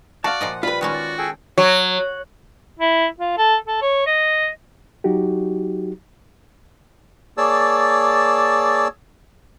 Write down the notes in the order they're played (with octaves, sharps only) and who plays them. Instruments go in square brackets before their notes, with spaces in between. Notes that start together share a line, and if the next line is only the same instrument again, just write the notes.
[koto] F#4 [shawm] D5 [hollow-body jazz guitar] F5 A5 [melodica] F#5
[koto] A#2 F3 D#5
[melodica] G3 [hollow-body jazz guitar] F4 B4 [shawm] B5
[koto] D#3 G#3 C#4 [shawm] F#4
[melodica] D5
G#4 A4 G5
[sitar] F#3
[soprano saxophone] E4
F4
A4
A4
C#5
D#5
[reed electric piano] F#3 D#4 F#4 G4
[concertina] A#3 G#4 C#5 D5 A5 E6